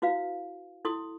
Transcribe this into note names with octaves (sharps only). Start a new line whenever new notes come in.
E4 F#4 B4 F5
E4 A4 C6 D#6